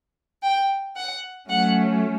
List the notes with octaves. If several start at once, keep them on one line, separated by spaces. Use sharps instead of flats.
G5
F#5
F#3 A3 C#4 F#5